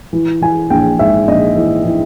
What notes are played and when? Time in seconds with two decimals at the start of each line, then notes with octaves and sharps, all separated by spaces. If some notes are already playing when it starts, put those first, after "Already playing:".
0.13 E3
0.42 E3 G#5
0.70 A#1 G5
0.99 G#2 E5
1.28 A#1 D#5
1.56 E3
1.85 E3